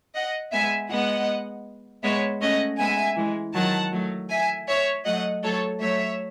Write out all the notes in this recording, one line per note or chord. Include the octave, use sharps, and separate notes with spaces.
D#5 F#5
G#3 B3 E5 G#5
G#3 B3 D#5 F#5
G#3 B3 C#5 E5
A3 C#4 D#5 F#5
G#3 B3 E5 G#5
E3 G#3
D#3 F#3 F#5 A5
F#3 A3
E5 G#5
C#5 E5
F#3 A3 D#5 F#5
F#3 A3 A4 C#5
F#3 A3 C#5 E5